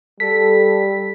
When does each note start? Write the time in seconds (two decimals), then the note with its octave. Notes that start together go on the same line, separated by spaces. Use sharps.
0.20 G3 A4 B6